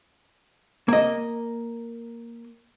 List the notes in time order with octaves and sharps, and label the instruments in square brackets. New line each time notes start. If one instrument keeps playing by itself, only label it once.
[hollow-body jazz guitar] A#3 D#5